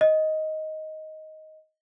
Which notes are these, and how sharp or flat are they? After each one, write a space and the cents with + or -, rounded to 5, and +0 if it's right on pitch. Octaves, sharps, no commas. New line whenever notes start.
D#5 +10